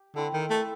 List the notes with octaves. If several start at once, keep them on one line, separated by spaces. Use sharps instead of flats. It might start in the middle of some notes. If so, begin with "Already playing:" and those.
Already playing: G4
D3 C4 E4 A4
D#3
A3